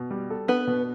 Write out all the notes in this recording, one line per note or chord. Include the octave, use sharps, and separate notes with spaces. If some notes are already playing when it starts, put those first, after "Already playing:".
Already playing: B2
G3
A4
B3 D4 B4
B2